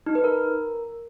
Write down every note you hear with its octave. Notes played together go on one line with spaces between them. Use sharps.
D#4
B4
A#4